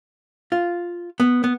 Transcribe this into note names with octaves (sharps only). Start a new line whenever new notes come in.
F4
B3
B3